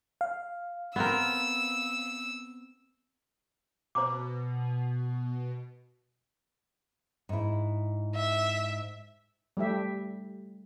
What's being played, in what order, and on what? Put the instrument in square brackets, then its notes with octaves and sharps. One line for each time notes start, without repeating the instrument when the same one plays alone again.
[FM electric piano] F5
[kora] B3 C4 A#4 [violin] E6
[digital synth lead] B2 [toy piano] C5 A#5 D6
[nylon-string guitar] G#2 E4
[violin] E5
[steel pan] G3 A3 G4 E5